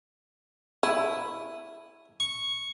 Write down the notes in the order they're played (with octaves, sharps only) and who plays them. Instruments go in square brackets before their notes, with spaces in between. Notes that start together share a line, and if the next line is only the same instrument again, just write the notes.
[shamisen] E4 [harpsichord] D#6
[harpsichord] C#6